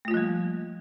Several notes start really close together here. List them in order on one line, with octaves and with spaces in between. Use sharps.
A3 F4 A#3 F3 G3